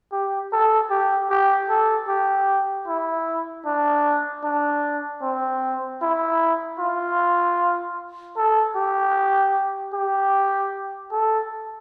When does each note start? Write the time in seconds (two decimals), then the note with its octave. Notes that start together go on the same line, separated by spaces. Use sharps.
0.12 G4
0.52 A4
0.90 G4
1.30 G4
1.70 A4
2.08 G4
2.87 E4
3.66 D4
4.44 D4
5.22 C4
6.02 E4
6.79 F4
8.37 A4
8.76 G4
9.94 G4
11.12 A4